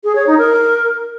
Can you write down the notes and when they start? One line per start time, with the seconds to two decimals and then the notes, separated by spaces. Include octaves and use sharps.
0.04 G#4
0.15 C#5
0.27 D#4
0.38 A#4